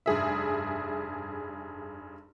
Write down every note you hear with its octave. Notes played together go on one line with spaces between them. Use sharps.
F1 G2 G#4 E5